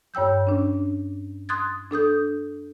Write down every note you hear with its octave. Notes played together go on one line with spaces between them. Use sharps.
G2 C#5 G5 E6 G6
C#4 D4
C6 D#6 F#6 G#6 A6
D4 A4 D#6 G6